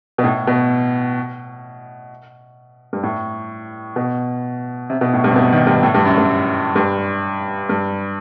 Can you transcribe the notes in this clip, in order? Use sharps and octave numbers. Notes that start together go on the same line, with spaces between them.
B2
A2
B2
G2
A2
B2
C3
B2
A2
G2
C3
B2
D#3
G2
A2
G2
F#2
G2
G2
G2